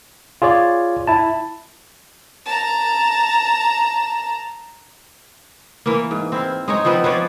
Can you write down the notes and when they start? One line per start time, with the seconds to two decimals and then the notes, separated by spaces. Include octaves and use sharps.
0.42 F4 G#4 C#5 D5
1.07 E4 A5
2.46 A5 A#5
5.86 E3 A#3
6.11 G#2
6.32 C4 E4 F5
6.68 G#3 D#4 C#5
6.85 F3 B3 C4 B4
7.04 F3 B4 C#5 D5